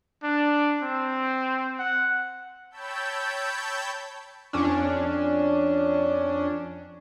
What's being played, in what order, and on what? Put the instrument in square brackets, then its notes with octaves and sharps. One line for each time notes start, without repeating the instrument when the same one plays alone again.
[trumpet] D4
C4
F#5
[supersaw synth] C#5 G5 A5 B5 E6 G6
[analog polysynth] F2 C#4 D4